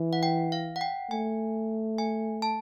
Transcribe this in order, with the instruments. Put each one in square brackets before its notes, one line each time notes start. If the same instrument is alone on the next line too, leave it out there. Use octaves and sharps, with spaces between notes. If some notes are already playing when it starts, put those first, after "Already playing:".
Already playing: [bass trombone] E3
[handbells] F#5
G5
F5
F#5
G5
[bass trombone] A3 [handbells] G#5
[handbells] G#5
A5